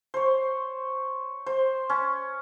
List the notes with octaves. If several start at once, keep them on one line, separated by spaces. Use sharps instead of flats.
C5 C#5
C5
C#4